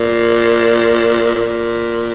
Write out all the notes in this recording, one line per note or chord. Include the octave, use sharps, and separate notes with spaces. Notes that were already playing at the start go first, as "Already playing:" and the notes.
Already playing: A#2
A#2